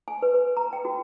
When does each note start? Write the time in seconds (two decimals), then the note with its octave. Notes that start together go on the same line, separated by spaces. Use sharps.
0.08 G#5
0.22 B4
0.34 B4
0.57 A#5
0.73 G5
0.85 F#4